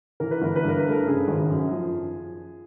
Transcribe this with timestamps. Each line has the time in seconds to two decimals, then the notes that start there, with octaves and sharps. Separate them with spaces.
0.20 E3 A#4
0.31 B4
0.42 G1 A#4
0.56 B4
0.64 G2 A#4
0.80 B4
0.85 A3
0.91 A#4
1.06 C#3 G#4
1.28 G#1
1.49 F#2
1.71 F3